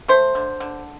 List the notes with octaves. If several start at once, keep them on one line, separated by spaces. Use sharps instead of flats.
A3 C5
D3
D3